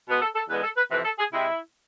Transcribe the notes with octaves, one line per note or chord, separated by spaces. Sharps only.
B2 G#3 B3
A4
A4
E2 D3 G#3 B3 B4
A4
B4
F2 C3 E3 B4
A4
G#4
C3 G#3 C4 E4